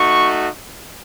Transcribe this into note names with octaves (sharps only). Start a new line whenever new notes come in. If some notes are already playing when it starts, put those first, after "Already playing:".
Already playing: A3 D#4 F#4 C#6